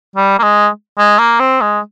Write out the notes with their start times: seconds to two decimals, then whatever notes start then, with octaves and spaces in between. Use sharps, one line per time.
0.16 G3
0.39 A#3
0.43 G#3
0.98 G#3
1.19 A#3
1.39 C4
1.61 G#3